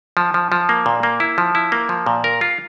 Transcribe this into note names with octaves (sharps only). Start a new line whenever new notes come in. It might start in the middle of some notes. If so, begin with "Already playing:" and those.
F3
F3
F3
A#3
A#2
A#3
E4
F3
E4
A#3
F3
A#2
A#4
F4